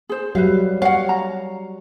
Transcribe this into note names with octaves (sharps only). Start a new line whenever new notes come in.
G#4 C5
F#3 G3 B4 E5 F5
C#5 F5 F#5
A#5